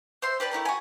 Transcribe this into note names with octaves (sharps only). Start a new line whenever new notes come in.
C5 E5 C6
G4 B4 D5 A5
A3 E4 G4 A#4
F#4 G#5